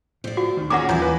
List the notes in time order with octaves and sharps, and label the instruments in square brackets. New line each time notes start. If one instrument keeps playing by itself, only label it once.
[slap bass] A2 [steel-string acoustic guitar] C5 D5
[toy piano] F#4
[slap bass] D2 D#3
[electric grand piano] A#2 C#4 A#6 [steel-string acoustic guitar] G#4 [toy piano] F#5 A#5 D6
[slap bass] D#2 G3 [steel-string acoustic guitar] E3 E4 [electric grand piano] F4 G#5 [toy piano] C#5 A#5
[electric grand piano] B4 G#5